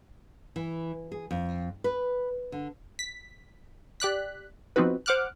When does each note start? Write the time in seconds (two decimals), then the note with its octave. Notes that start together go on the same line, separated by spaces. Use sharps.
0.56 E3
1.12 G#4
1.31 F2
1.84 B4
2.52 D3
2.99 B6
4.00 G4 D5 F#6 B6
4.76 F3 B3 C4 D#4 F#4 B4
5.06 C5 F#5 D6 F6 F#6